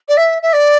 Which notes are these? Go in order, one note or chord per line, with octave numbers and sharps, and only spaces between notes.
D5
E5
E5
D5